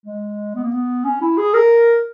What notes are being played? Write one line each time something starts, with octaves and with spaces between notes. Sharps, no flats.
G#3
B3
A#3
B3
C#4
E4
G#4
A#4